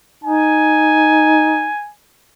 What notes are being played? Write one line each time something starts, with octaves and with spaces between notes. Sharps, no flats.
D#4 G#5